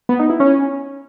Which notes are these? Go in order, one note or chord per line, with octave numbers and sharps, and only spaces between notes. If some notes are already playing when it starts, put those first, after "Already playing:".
B3
D#4
E4
C#4